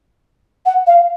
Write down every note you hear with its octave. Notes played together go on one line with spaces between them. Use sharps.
F#5
F5